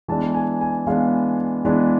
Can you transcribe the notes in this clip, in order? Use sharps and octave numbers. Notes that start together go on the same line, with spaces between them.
E3 G#3 B3 D4 A5
G#5
G#5
E3 G#3 B3 D4 F5
E3 G#3 B3 D4